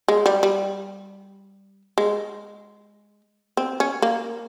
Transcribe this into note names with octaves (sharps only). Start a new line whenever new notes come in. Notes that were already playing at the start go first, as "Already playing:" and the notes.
G#3
G3
G3
G#3
C4
C#4
A#3